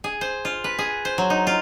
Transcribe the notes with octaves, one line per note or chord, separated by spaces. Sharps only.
G#4
C5
F4
B4
G#4
C5
F#3
D#4
F4